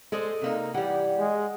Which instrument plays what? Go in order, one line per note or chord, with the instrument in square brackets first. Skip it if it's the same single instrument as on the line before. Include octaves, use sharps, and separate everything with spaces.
[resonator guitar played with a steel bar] G#3 G#4 C5 [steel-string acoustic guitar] A4 D5 D#5
[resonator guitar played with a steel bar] C3 A#3 D#4
[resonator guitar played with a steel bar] E3 G3 [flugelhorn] G4 [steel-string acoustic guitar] F#5
[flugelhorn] G#3